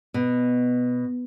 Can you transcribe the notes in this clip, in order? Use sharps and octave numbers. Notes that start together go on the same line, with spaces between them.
B2